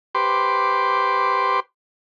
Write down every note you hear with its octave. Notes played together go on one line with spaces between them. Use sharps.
G4 B4 C5 C6 D6